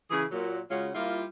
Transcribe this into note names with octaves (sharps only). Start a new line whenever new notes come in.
C#3 E3 G#4
A#2 F#3
C#3 G#3 C#4 F4 F#4
G3 A#3 E4 F4